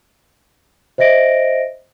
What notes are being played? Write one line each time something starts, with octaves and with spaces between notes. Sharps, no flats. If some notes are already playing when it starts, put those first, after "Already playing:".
C5 D#5 E5 A#6 D7